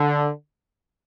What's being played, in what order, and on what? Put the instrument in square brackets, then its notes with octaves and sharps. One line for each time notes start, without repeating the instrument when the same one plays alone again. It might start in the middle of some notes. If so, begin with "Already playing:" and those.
Already playing: [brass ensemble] D3